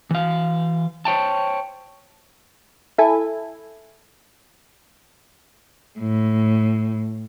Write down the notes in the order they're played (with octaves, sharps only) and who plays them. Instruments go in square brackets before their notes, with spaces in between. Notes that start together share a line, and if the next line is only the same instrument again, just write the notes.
[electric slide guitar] E3 F5
C5 C#5 G5 A5
[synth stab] E4 A4 G#5
[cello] A2